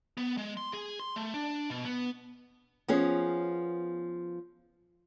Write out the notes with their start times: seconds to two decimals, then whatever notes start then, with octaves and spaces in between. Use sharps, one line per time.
0.17 B3
0.37 G#3
0.57 C6
0.73 G#4
1.00 C6
1.16 A3
1.34 D4
1.70 B2
1.85 B3
2.88 F3 B3 C#4 G#4